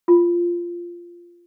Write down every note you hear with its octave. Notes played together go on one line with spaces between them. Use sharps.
F4